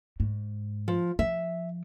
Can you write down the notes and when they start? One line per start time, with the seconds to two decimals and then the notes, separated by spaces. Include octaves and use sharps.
0.20 G#2
0.88 F3
1.19 F3 E5